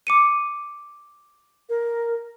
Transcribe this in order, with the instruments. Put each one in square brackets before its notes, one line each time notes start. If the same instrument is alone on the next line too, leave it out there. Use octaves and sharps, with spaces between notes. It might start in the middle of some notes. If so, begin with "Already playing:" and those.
[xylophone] D6 C#7 D#7
[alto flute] A#4